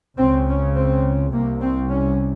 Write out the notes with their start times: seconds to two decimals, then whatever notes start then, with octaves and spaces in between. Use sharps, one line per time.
0.18 C#2 C#3 C4
0.48 C#4
0.75 C4
1.32 C2 C3 A#3
1.61 C4
1.90 C#4